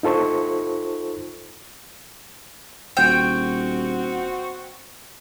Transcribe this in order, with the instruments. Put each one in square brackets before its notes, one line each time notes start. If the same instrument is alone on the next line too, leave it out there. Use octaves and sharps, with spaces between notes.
[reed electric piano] D#4 F4 A4 C5 C#6
[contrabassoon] D#1 [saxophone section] C4 F#4 [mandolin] G5